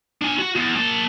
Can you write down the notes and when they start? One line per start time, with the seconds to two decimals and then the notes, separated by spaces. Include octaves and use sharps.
0.22 D4 G#5
0.39 F#4
0.56 E2
0.76 A#3 A5